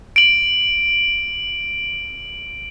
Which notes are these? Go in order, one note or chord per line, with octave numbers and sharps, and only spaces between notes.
D7 F#7